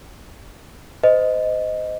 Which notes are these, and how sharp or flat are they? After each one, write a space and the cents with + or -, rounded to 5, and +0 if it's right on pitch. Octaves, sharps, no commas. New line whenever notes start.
C5 -30 D#5 +0